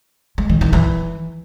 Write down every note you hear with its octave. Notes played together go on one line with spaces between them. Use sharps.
G#3
D#3
D#3
E3